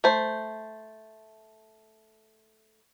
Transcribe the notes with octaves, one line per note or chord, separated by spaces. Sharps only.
A3 C5